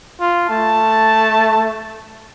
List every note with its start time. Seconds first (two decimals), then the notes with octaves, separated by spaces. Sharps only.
0.20 F4
0.50 A3 A5